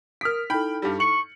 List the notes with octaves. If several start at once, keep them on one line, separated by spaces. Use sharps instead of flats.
A#4 D#6 F6 B6 D7
D#4 E4 A4 G5 B5
G2 G3
C#6 C#7 F#7